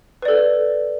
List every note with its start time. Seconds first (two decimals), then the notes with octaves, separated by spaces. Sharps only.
0.22 B4
0.25 D5
0.28 A4